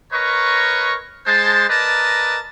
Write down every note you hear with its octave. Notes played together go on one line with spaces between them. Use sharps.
A#4 B4 C#5 D#5 A#5 C#6
G#3 C5 A5
A#4 B4 D5 D#5 A5 A#5